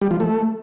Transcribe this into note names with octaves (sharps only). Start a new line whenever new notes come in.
G3
F3
A3